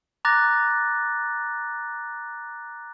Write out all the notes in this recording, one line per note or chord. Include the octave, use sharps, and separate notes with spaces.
A#5 D6 F#6 A6 A#6